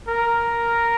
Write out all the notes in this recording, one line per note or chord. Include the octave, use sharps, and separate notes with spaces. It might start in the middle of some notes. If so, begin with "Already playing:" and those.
A#4